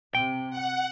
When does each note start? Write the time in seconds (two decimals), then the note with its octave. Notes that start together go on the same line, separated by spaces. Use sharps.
0.15 C3 G5
0.50 F#5